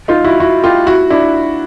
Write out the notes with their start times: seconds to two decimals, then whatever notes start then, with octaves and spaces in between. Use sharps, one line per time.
0.08 D#4 F4
0.24 E4 F#4
0.40 E4 F#4
0.63 F4 G4
0.86 E4 F#4
1.10 D4 E4